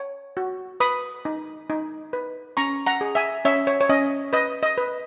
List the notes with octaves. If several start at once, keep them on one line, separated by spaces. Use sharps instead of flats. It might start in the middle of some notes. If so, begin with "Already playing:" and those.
Already playing: C#5
F#4
B4 B5 D#6
D#4
D#4
B4
C#4 A#5 C#6
F#5 A#5
G#4
E5 G#5
C#4 C#5 E5
C#5
C#5
C#4 D#5
B4 D#5
D#5
B4